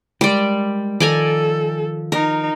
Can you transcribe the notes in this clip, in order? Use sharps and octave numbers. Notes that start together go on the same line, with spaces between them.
G3 G#3 A#4 D5
D#3 F3 A4 D5 G#5 A#5
D#4 A#4